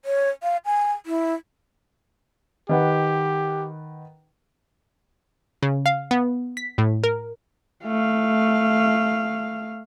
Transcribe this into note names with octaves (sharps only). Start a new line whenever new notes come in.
C#5
F5
G#5
E4
D#3 G4 B4 F#5
C#3
F5
B3
B6
A2
A#4
A3 F5